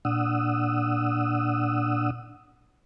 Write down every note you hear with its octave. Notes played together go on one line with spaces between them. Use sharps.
A#2 D4 F#5 D#6 E6